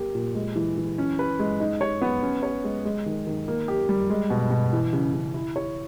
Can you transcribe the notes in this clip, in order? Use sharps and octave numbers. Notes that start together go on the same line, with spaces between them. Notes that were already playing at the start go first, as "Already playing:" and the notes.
Already playing: A#3 G4
A#2
G#3
E3
E3
C#4
B4
G#3
D#4
C#5
B3
C#4
C#5
G#3
G#3
D#3
D#3
A#3
G4
G3
G#3
B2
B2
E3
C#3
C#3
E4
C#5